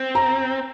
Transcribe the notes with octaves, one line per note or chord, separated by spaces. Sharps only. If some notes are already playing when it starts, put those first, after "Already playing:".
Already playing: C4
A#5